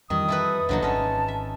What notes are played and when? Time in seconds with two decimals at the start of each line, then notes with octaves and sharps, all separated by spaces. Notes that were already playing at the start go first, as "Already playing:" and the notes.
0.10 F2 D#3 E3 G3 D#6
0.28 E4 A4 B4
0.69 C2 F#2 A#2 D3 F#3 D#4
0.82 G#1 G#3 C#4 A5
1.28 E5